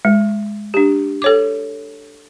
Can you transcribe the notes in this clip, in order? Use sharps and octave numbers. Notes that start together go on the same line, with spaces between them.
G#3
D4 G4
A4 C#5 D6